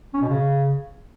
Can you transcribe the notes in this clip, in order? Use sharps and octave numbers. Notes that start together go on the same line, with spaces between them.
C#4
B2
C#3